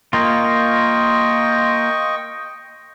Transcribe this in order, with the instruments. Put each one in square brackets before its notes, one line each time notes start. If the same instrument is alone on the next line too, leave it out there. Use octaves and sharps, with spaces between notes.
[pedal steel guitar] A#3 F4 [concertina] D#5 G5 C#6